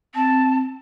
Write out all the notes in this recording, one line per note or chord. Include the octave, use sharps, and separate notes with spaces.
C4 A5